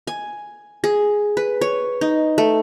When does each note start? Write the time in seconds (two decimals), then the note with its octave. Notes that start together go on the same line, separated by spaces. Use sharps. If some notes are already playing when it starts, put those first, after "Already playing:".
0.07 G#5
0.84 G#4
1.37 B4
1.61 C#5
2.01 D#4
2.38 A3